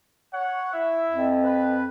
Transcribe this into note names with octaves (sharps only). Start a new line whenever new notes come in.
C#5 F#5
E4 E5
F2
B4